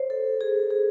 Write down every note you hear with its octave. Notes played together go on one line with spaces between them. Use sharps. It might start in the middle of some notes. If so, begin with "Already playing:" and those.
Already playing: C5 C#5
A4
G#4
G#4